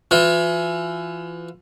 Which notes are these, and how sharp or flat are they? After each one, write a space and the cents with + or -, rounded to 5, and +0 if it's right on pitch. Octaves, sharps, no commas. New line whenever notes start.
E3 +35 F4 +35